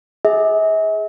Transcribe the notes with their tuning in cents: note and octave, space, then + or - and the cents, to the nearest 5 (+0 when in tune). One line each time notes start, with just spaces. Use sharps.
G#4 +0 E5 -45